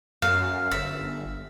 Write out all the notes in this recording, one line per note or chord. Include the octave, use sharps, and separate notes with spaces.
F#2 F5
G1 E5